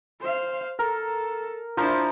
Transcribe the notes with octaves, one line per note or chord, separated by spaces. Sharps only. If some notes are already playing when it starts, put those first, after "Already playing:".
C5 F5
A4 A#4
F3 D4 E4 A#4 C5